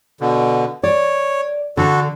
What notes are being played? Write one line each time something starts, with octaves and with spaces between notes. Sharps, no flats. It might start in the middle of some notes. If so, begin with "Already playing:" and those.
B2 D3
C#5 D5
D3 D4 F#4 A4 A5